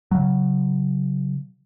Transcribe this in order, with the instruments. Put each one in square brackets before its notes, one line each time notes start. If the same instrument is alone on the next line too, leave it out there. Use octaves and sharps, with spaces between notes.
[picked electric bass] C#3 F#3